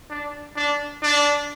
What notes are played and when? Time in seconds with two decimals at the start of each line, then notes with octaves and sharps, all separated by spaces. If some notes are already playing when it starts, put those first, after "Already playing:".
0.10 D4
0.56 D4
1.03 D4